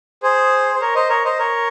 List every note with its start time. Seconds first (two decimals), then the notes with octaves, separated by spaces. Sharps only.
0.23 G#4 C5
0.74 C5
0.81 A#4 C#5
0.95 C5 D#5
1.09 A#4 C#5
1.25 C5 D#5
1.39 A#4 C#5